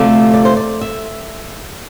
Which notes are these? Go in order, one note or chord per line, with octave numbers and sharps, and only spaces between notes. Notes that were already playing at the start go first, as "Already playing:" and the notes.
Already playing: D2 C3 F3 A3 D5
D5
C5
D5
E5